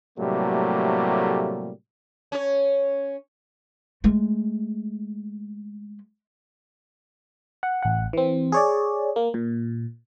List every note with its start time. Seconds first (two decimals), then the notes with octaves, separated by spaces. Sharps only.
0.19 A2 C3 F#3 G3 A3 A#3
2.32 C#4 C#5
4.04 G#3 A3
7.63 F#5
7.83 A1 F#5
8.13 E3 C4
8.52 G#4 C#5 D5
9.16 A#3
9.34 A#2